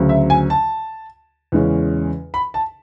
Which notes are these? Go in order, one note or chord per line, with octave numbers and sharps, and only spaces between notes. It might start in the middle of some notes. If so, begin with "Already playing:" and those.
Already playing: D2 C#3 F#3
E5
G#5
A5
E2 C#3 G#3 C#4
B5
A5